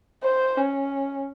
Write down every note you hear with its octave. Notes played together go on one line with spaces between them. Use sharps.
C5
C#4